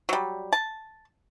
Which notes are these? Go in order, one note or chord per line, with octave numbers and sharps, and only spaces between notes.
F#3 G3
A5